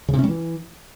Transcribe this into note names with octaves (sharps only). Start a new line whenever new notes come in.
C#3
C3
C#4
G3
E3